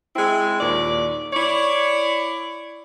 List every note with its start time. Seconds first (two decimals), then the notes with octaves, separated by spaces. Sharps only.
0.16 G#3 C4 E4
0.60 D#2 A#2 D5
1.33 E4 C#5 D5